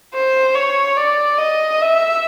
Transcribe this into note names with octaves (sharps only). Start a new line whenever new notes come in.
C5
C#5
D5
D#5
E5